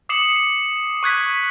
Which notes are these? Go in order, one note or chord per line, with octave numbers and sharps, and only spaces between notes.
D6 D#6 C7 C#7 E7 F#7
C#6 F#6 G#6 B6